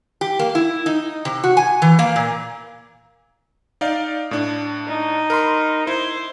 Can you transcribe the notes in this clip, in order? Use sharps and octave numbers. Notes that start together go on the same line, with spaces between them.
G4
A#3
E4
D#4
C3
F#4
G#5
E3
A#3
A#2
D#4 D5 F5
A2 D4
D#4
A#4 B5 C6
E4 C5